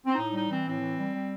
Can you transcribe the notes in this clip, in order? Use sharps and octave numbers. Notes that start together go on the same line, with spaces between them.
C4
A2 D#4
G3 D#4
E3 C4
A2 C4
E3
G3
G3